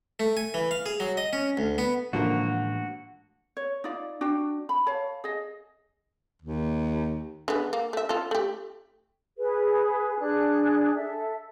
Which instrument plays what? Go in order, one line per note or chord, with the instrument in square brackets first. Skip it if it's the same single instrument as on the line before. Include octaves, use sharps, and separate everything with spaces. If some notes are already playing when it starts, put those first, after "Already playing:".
[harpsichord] A3
G#5
E3
F5
G#4
F#3
D#5
C#4
D2
B3
[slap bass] A2 E3 G#3 [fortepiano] D3 F3 A#3 [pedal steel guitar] F#4
[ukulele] C#5
D#4 F4 D5 F5
D4 F#4 G5
B5
C#5 F5 A5
G#4 D#5
[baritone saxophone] D#2
[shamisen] D3 G#3 B3
A#3
A3 E5
F4 A4
A3 G4
[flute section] G#4 B4
D4 G#4 F#6
A4 E5